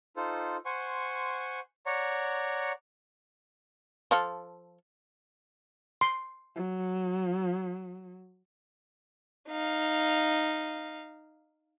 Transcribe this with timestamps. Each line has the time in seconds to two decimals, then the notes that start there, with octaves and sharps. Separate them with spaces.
0.17 D#4 F4 A4 C5
0.65 C5 F#5 G#5 C6 C#6
1.86 C#5 D5 F#5 A#5 C#6
4.11 F3 F4 A4
6.01 C6
6.55 F#3
9.49 D#4 F5